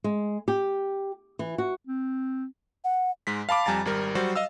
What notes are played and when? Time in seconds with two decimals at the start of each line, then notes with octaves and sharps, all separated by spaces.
0.04 G#3
0.48 G4
1.39 E3
1.58 F#4
1.87 C4
2.84 F#5
3.27 G#2 G#3 B6
3.49 F5 A5 B5 D6
3.66 F2 G3 G#5 A#5 A6
3.85 G#1 G3 A#4
4.15 F#3 G3 F#4 C5
4.36 D#5 F5 E6